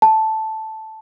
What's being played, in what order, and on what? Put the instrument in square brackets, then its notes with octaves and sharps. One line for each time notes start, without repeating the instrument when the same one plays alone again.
[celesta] A5